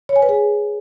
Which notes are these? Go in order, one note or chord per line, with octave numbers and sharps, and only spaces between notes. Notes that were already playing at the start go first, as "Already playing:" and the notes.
C#5
G#5
B4
G#4